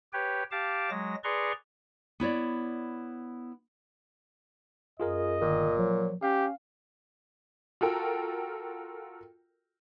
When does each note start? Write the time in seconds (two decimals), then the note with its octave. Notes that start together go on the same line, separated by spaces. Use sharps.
0.13 G4 B4 C#5 G5
0.51 G4 F5 A5 D6
0.90 F#3 G#3 A#6
1.24 G#4 B4 D5 A#5 C6 C#6
2.20 B3 E4 C#5 D5
5.00 F#2 F4 G#4 A#4 D#5
5.41 G1 A#2 D#3
5.78 F3 F#3
6.23 C#4 G4 F5
7.81 F4 F#4 A4 A#4 G5